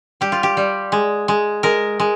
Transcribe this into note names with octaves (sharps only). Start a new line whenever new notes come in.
G3 G4
F4
G4
G3
G#3
G#3
G#3 A#4
G#3